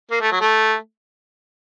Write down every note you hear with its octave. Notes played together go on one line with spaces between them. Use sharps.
A#3
A3
F#3
A3